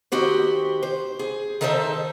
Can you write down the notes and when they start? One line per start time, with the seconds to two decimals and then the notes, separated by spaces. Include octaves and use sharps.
0.12 D#3 F#4 G4 C5
0.83 C5
1.19 G#4
1.61 D#3 D#4 A4 C5 D#5 E5